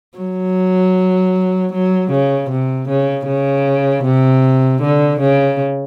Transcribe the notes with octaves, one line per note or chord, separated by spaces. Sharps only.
F#3
F#3
C#3
C3
C#3
C#3
C3
D3
C#3